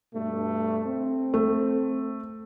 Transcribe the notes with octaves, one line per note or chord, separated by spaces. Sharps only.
G2 B2 A3
C4
A3